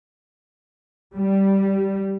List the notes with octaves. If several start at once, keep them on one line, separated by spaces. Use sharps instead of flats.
G3